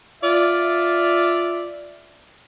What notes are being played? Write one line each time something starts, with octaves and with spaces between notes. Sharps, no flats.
F4 D5 E5